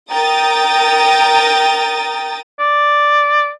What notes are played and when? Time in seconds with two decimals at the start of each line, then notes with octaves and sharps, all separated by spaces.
0.11 A#4 G5 A#5 D#6 A6
2.60 D5